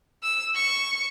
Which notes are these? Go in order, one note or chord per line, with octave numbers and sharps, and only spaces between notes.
E6
C#6